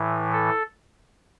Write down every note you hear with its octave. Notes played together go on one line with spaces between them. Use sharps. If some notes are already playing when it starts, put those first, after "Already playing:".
Already playing: A2 E3
A4